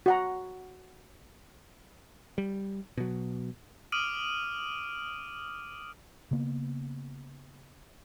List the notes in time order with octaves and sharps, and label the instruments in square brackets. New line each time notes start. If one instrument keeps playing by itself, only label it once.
[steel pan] F#4 F#5 A#5
[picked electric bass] G3
B2 F#3
[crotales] D6 D#6 F6 D7 D#7 F#7
[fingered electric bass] C#3 A#3 B3